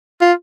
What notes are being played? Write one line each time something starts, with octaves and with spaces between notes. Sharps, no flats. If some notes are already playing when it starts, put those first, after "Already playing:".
F4